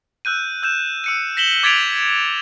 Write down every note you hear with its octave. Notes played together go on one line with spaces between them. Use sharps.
E6 F#6 G6 D#7
E6 G6 E7
E6 C#7 D#7
A#6 B6 E7 F#7 G7
D6 G#6 A6 B6 D7 F7